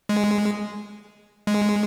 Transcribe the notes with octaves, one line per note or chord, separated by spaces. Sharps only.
G#3
G#3